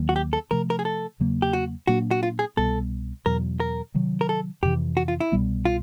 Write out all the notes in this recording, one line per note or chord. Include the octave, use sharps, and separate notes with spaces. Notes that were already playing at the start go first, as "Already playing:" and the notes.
Already playing: D#2 D#3 F#3 A#3
F#4
G4
A4
C3 F3 A3 A#4
A#4
G#4
A4
E2 C#3 F#3 A#3
G4
F#4
A#2 F#3 A#3 D4 F#4
F#4
F4
G#4
C2 B2 G3 B3 A4
E2 B2 F#3 A#4
A#4
C3 D#3 F#3
A#4
A4
F2 C3 E3 G4
F#4
F4
E4
C2 B2 G3 B3
F4